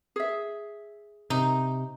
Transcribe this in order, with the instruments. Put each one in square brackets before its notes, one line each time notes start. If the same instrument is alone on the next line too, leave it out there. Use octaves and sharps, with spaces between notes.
[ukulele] G#4 E5
[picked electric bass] C3 [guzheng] D#4